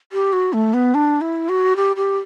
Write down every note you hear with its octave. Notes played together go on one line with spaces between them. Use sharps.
G4
F#4
A3
B3
D4
E4
F#4
G4
G4